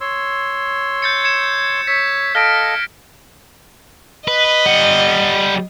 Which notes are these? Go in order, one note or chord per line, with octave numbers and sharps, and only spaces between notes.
C#5 C6 E6
G6 A6 C#7
G#6 C#7 E7
C#5 E6 B6
A4 D#5 F5 F6 A#6 D7
B4 D#5
G3 F#5